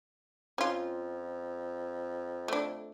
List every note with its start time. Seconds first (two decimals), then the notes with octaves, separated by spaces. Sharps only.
0.58 F2 C#4 F4
2.48 A3 D4